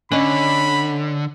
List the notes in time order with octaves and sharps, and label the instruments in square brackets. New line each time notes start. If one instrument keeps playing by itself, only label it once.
[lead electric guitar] D3 [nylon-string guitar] C#4 [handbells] C#5 D#5 [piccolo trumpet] B5